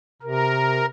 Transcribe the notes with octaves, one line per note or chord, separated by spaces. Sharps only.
C3 A#4